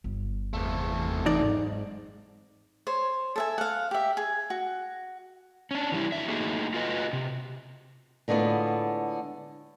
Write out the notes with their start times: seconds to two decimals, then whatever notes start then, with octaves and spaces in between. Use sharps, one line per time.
0.04 G1
0.54 E2 C3 A3
1.26 E3 D#4 D5
1.43 G#2 F#3 C4
2.87 C5 C#5
3.36 A4 E5 G#5
3.58 F5 F#5
3.91 G4 E5
4.17 G#4
4.50 F#4
5.71 C#4 D4
5.92 E3 G3 E4
6.12 D3 F#3 E5
6.28 A3 A#3 D#4 F#4 G#4
6.74 F4 F#4 G#4 B4 D#5
7.13 C3
8.28 A2 D3 G#3 B3 F4